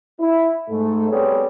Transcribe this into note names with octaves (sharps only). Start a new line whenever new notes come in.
E4
G#2 A3
G3 B3 C4 G#4 A4 C#5